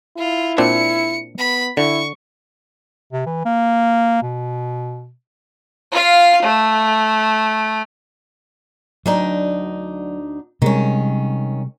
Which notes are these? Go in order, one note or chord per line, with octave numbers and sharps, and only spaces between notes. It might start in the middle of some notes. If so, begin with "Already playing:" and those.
E4 F4
A#2 C4 D4 C#7
B3 B5
D3 E4 C#6
C3
E3
A#3
B2
F4 F5
A3
D2 F#3 D4 D#4
C3 D#3 G3 G#3 C#4